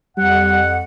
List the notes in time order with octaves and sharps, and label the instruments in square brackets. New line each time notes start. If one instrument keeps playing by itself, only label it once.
[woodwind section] F2 F#5 [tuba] G3